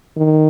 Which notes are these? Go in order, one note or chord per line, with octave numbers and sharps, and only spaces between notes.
D#3